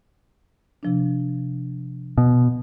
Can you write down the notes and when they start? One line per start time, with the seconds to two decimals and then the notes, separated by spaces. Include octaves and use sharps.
0.83 C3 F3 D4
2.18 B2